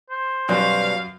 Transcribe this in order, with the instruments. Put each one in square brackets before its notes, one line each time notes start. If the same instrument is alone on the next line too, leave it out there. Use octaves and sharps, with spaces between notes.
[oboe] C5
[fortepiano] F#2 F#3 [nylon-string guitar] B2 G3 C#4 [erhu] F5